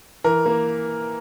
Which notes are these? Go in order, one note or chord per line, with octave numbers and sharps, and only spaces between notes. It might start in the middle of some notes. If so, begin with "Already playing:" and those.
E3 A#4
A#3